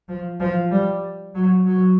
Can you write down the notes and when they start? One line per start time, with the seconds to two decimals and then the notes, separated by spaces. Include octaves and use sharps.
0.08 F3
0.40 F3
0.71 G3
1.35 F#3
1.66 F#3